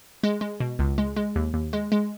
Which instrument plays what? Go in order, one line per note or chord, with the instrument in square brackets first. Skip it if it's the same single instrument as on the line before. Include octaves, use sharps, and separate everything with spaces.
[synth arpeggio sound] G#3
G#3
B2
C#2
G#3
G#3
D#2
D#2
G#3
G#3